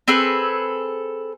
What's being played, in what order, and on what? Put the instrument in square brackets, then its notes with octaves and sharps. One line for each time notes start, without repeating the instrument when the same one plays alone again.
[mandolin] C4 G#4 A4 B4